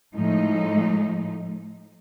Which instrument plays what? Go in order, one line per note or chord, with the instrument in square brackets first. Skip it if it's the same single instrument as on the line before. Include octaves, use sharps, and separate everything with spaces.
[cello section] A2 F3 G#3 D#4